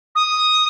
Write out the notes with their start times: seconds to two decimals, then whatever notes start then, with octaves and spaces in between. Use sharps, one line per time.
0.15 D#6